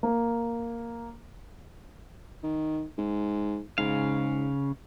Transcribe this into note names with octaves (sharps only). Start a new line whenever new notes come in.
A#3
D#3
G#2
G#2 C#3 F5